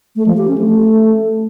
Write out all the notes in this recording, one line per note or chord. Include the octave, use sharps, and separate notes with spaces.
A3
F3
G4
C#4
A3